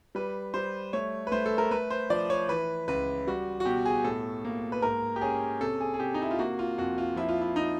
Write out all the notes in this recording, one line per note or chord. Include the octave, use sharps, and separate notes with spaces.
G3 B4
G3 C5
A3 C#5
B4
A3 C5
A4
A#4
A3 B4
C5
F3 D5
C#5
E3 B4
C#2 B4
G3 F#4
F#4
B2 G4
G#4
A2 A4
A#3
B4
G#2 A#4
G4
C#4 G#4
C3 A4
G#4
G#4
C3 G4
D#4
E4
F4
A#3 F#4
F4
F2 F#4
F4
F3 E4
F4
E4
D#4